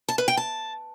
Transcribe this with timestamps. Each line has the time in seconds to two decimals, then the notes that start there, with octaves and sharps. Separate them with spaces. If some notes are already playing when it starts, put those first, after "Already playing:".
0.09 A5
0.18 B4
0.28 G5
0.37 A5